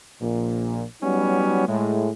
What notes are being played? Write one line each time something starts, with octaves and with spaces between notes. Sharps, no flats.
A#1 A#2
F#3 G3 B3 C#4 D#4
A2 G#3